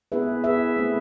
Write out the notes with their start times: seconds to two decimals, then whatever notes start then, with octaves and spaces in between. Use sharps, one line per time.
0.12 B3 E4 G#4 B4 E5
0.44 B3 E4 G#4 B4 E5
0.76 A3 C4 E4